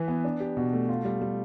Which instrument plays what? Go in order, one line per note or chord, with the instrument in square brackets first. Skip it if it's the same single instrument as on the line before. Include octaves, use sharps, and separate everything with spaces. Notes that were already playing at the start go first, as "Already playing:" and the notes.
Already playing: [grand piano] E3 E4 B4
B3
D4
G4
B2
A3
F4
G3
G3